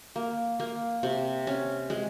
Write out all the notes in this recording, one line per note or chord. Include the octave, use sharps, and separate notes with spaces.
A#3
A#3
C3
C#4
G#3